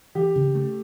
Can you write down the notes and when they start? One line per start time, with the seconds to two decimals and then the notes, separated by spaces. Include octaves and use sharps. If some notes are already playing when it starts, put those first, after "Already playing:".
0.15 E3 G4
0.35 C#3
0.55 A3